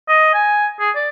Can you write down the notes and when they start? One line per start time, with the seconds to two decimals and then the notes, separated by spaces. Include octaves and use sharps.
0.09 D#5
0.34 G#5
0.80 G#4
0.95 D5